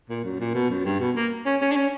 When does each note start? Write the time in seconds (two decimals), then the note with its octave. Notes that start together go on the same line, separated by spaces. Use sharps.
0.10 A#2
0.24 F#2
0.40 A#2
0.54 B2
0.70 F#2
0.85 G2
1.00 B2
1.16 A#3
1.46 C#4
1.61 C#4
1.71 D4
1.76 C#4